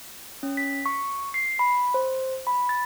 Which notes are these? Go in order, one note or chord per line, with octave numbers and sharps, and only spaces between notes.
C#4
B6
C#6
C7
B5
C5
B5
A6